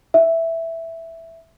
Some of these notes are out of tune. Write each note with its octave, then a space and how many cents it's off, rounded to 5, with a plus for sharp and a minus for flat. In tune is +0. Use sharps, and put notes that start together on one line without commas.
E5 +0